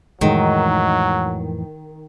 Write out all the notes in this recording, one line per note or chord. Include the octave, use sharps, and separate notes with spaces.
F2 A2 D#3 E3 F#3 G#3